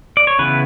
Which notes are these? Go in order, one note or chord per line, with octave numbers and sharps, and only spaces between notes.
D5
C#5
C#3 E3 B3 E4 B4